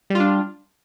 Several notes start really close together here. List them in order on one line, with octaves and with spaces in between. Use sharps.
G3 F4 D4